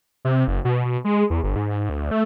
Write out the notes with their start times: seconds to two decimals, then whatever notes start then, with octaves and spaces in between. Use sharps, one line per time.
0.25 C3
0.48 F#1
0.65 B2
0.85 B2
1.05 G#3
1.30 E2
1.44 G1
1.56 G#2
1.90 D2
2.11 A3